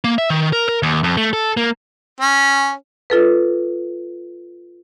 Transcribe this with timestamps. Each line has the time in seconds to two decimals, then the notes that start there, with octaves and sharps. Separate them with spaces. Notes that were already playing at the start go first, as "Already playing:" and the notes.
0.04 A#3
0.18 E5
0.30 D#3
0.53 A#4
0.69 A#4
0.83 D#2
1.04 F2
1.17 A3
1.33 A4
1.57 A#3
2.21 C#4
3.10 F4 A4 B4